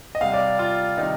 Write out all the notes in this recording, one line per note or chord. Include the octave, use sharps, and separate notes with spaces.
D#5
C3 G3 F5
D5
F4
C3 D#3 G3 D#4